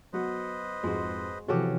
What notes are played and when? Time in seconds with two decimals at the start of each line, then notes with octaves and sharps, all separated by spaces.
0.13 F#3 B3 F#4 B4 C5 D#5
0.83 F2 G#2 G#3 F#4
1.48 C3 E3 F3 C#4 F#4 G4 A4